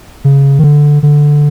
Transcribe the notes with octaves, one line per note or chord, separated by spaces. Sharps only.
C#3
D#3
D3
D3